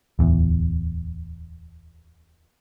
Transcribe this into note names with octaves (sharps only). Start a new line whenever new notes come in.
D1 E2